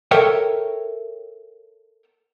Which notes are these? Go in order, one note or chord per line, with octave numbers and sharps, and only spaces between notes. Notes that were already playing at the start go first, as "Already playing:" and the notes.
A4 A#4 C#5 E5 G5